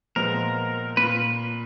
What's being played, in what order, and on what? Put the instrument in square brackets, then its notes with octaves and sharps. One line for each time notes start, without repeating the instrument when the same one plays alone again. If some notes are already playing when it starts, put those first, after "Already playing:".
[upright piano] A#2 F3 G#3 B3 [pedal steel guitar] A#4
[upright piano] A#2 [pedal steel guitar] B4